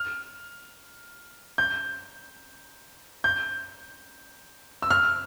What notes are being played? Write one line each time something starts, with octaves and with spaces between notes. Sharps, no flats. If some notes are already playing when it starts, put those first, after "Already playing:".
Already playing: F6
G6
G6
E6
F6